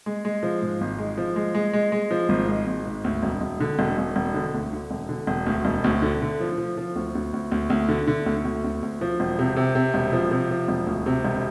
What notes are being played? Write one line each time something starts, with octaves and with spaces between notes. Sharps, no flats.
G#3
G#3
F3
G#2
G#1
G#3
F3
G#3
G#3
G#3
G#3
F3
G#1
G#3
G#1
G#2
D2
E1
E1
D3
E1
E1
E1
D3
D2
D3
E1
D3
E1
D2
E1
D2
D3
D3
F3
F3
F3
D2
D2
D2
D2
D2
D3
D3
D2
D2
D2
D2
F3
E1
C3
C3
C3
E1
F3
C3
F3
E1
D2
C3
E1